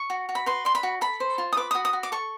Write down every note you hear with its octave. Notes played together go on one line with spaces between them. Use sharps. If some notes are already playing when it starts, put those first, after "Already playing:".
Already playing: C#6
F#4
F#4
B5
B4 C6
D5 C6
B5
F#4
A4 B5
C5
F4
D#6
B4 D6
F#4 D#6
D#6
F#4
D6
A4 C#6